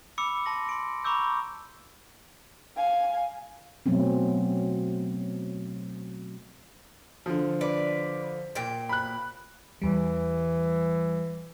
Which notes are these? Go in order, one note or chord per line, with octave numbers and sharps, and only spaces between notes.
B5 D6 E6 C#7
A5 C6 A#6
C6 D7
A#5 B5 C#6 D6 E6 G6
F5 G#5
B2 F#3 A3 C4 C#4
D3 F3
B4 D5
A#2 G5
B5 F#6
E2 E3 G3